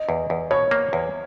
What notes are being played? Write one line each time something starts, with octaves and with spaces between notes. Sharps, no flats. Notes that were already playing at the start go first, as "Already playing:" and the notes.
Already playing: D#5
E2
E2
B2 C#5
A#3
E2